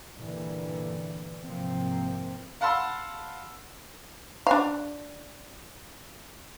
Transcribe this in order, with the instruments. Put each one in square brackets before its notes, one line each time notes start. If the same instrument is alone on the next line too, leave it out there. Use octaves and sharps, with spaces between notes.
[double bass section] G2 A#2 D3 E3
G#2 C3 F3 A#3 C4
[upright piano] F5 F#5 A5 B5 C6 E6
[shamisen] D4 F5